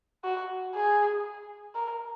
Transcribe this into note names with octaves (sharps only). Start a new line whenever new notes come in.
F#4
G#4
A#4